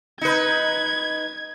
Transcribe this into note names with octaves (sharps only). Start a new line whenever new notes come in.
D#4 B4 G#6